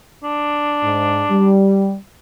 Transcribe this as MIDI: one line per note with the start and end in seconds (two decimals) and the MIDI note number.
0.24 1.58 62
0.83 1.22 44
1.30 1.94 55